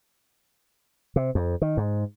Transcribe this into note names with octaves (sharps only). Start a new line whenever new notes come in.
C3
F2
D#3
G#2